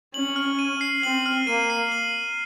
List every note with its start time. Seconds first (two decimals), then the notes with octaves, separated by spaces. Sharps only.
0.14 C#4 F#7
0.36 F6
0.59 D#7
0.81 C7
1.03 C4 F#7
1.26 F6
1.47 A#3 D#7
1.70 C7
1.92 F#7